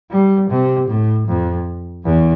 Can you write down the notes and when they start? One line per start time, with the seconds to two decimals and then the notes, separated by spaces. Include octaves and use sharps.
0.10 G3
0.50 C3
0.88 A2
1.27 F2
2.05 E2